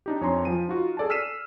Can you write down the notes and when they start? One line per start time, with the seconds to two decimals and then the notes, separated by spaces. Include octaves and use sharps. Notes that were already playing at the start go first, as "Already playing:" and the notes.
0.06 D4 D#4 G4
0.21 F2 C#5 G#5 A#5 C6
0.45 F3 D#7
0.68 D#4 F4 F#4
0.97 G#4 A4 D5 G#5 A5
1.10 E6 F6 B6 C7 D#7 E7